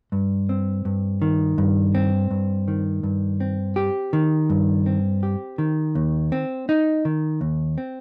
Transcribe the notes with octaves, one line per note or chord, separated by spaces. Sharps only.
G2
C4
G2
D#3
G2
C4
G2
D#3
G2
C4
G4
D#3
G2
C4
G4
D#3
D#2
C4
D#4
D#3
D#2
C4